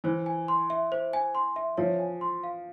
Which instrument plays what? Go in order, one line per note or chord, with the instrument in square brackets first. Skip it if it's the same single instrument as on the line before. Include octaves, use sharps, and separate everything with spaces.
[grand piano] E3 [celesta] C5
[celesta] G#5
C6
E5
C5
G#5
C6
E5
[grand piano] F3 [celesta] C#5
[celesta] G#5
C6
F5